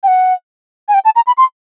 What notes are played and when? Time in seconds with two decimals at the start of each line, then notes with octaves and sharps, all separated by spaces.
0.03 G5
0.08 F#5
0.88 G#5
0.94 G5
1.05 A5
1.16 A#5
1.27 B5
1.38 C6